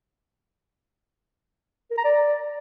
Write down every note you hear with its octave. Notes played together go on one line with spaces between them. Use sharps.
A#4
A#5
D5